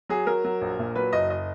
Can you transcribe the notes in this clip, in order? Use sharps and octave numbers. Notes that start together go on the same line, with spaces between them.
F#3 G#4
F#3 A#4
F#3
A#1
A#2
F#3 B4
F#1 D#5
D#5